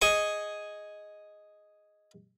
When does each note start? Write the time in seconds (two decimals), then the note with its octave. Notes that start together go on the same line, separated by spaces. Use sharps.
0.02 G#4 D#5 C#6